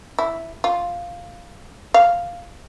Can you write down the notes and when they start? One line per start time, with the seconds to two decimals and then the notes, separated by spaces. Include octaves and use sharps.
0.19 E4
0.64 F4
1.94 F5